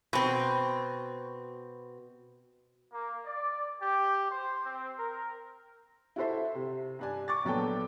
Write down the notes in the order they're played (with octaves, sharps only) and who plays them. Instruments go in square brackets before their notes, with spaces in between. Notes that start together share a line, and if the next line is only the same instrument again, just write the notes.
[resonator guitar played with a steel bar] B2 C4
[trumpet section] A#3
D5
G4
C5
C4
A#4
[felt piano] E4 F#4 A4 C5 E5
C3
G2 D4 G#5
C#6 D6 A6
A#1 F#3 B3 D4 A4 G5